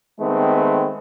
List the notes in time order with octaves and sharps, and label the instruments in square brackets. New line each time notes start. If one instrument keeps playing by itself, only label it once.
[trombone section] D#3 G#3 A3 B3 C4